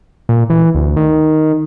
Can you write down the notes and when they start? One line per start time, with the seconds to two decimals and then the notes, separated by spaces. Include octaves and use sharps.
0.29 A#2
0.50 E3
0.75 D2
0.97 D#3